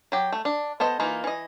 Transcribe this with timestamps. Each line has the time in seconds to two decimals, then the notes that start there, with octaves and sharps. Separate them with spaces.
0.12 F#3 G4
0.32 A3
0.45 D4
0.80 B3 A4 C5 D#5
1.00 E3 A#3 D#4 F4
1.24 E3 D#5